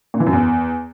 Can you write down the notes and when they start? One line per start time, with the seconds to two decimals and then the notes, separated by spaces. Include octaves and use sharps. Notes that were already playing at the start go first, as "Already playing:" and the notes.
0.14 A#2
0.20 E3
0.27 F#2
0.33 E2